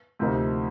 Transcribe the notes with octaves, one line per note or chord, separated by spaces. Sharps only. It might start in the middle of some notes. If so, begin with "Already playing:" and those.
D2 C3 F3 A#3 D#4